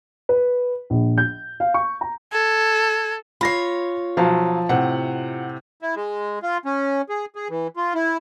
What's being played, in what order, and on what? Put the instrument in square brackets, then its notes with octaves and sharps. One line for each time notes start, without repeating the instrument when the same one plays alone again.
[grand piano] B4
A#1
G6
F5
C#6
A#5
[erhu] A4 [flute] G#6
[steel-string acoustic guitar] F4 C#5 [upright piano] B5 A#6 C7
[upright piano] B1 F#3 F5 [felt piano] F3
[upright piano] A2 C3 [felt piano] F#5
[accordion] E4
G#3
F4
C#4
G#4
G#4
E3
F4
E4